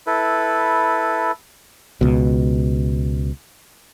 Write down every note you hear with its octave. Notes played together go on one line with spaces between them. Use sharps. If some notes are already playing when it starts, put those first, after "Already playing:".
E4 A4 B4
C#2 B2